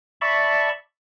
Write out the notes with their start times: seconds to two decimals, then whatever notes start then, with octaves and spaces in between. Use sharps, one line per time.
0.21 D5 E5 A5 B5 C#6